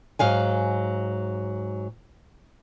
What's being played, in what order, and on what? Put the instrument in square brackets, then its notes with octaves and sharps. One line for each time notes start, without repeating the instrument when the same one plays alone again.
[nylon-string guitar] G#2 F#3 F5 G#5